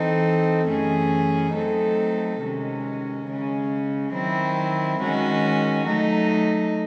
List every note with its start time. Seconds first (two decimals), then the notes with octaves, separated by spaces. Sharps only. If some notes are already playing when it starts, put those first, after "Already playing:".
Already playing: E3 C4 D#4 A4
0.66 F#2 E3 A3 C#4 G#4
1.53 F#3 A3 C4 D#4 A4
2.40 C3 D#3 G#3 C#4
3.26 C#3 G#3 C#4
4.12 D#3 F#3 C4 E4
5.00 D#3 G#3 C#4 F#4
5.87 F#3 A3 D#4